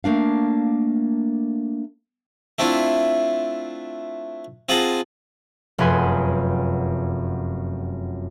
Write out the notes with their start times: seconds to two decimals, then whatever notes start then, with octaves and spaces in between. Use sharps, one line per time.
0.04 A3 A#3 D4 F5
2.59 A3 C4 D4 E4 F4
4.69 C4 F4 G#4 F#5 A5 A#5
5.78 F1 F#2 G#4 B4 G#5 C6